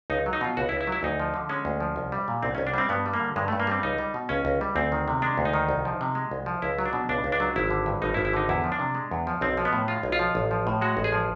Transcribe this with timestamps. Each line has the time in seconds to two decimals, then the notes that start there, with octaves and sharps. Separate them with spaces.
0.10 C#2 D#4
0.26 F#3
0.33 D#4
0.41 B2 F4
0.57 C#2 F#4
0.69 E4
0.72 C#2
0.81 E4
0.87 F#3
0.92 E4
1.03 D2 D#4
1.20 F3
1.34 D3
1.49 G#3 C#4
1.65 D2
1.80 F3
1.96 C2
2.12 G3
2.28 A#2
2.43 C2 C4
2.55 C#4
2.58 C2
2.67 D4
2.74 G3 C4
2.89 G2 B3
3.06 G3
3.14 A#3
3.20 D3
3.36 G2 G#3
3.48 A3
3.52 G2
3.60 A#3
3.67 G3 C4
3.83 C#2 D#4
3.98 G3
4.14 B2
4.29 C#2 C#4
4.45 C#2
4.61 G3
4.75 D2 C4
4.92 D#3
5.08 C3
5.22 G#3 D4
5.38 D2
5.45 D#4
5.54 D#3
5.69 C2
5.85 F3
6.01 C3
6.15 G#3
6.31 C2
6.46 F3
6.62 C#2 E4
6.79 F#3
6.86 D4
6.93 B2
7.09 C#2 D4
7.24 C#2
7.32 D4
7.40 F#3
7.56 G#1 E4
7.71 D3
7.86 G2
8.02 G#1 D#4
8.14 E4
8.17 G#1
8.25 E4
8.33 D3 D#4
8.49 E2 E4
8.64 F3
8.72 D4
8.79 C3
8.95 G#3
9.11 E2
9.27 F3
9.41 B1 C4
9.57 F3
9.65 B3
9.73 A2
9.88 G#3 F4
10.03 B1
10.12 F4
10.19 F3
10.35 A1
10.51 F3
10.67 A2
10.81 G#3 F#4
10.97 A1
11.04 G#4
11.12 F3